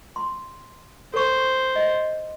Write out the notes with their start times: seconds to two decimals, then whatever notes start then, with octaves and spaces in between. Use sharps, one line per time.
0.16 C6
1.14 A4 C5 C#6
1.76 D#5